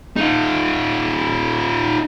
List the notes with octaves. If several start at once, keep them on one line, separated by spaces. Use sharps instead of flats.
D#4 F4